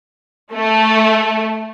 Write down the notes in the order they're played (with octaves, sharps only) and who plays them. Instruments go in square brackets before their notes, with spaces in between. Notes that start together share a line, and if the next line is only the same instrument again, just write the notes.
[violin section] A3